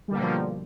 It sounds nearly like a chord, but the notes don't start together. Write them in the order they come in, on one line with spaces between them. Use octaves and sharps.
G3 D3 A#3 B2 F3